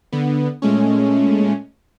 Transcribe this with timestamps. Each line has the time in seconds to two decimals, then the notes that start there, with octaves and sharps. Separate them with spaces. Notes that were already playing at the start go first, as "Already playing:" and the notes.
0.12 D3 B3
0.62 A#2 G#3 A3 C#4